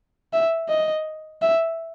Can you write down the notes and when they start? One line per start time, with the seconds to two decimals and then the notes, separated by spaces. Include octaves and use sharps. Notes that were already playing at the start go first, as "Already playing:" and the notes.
0.33 E5
0.69 D#5
1.41 E5